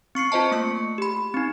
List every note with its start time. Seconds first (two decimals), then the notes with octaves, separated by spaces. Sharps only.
0.15 C4 C#6 C7 C#7
0.32 F4 C5 D#5 A5
0.51 A3 A#3 C#6 C#7
0.98 G4 B5
1.34 C4 D#4